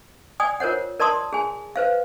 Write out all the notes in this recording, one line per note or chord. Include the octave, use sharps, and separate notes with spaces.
D5 G5 G#5 D#6
F4 A#4 C5 C#5 F#5
A#4 D5 A5 C6 D#6
G#4 G#5
B4 C5 F5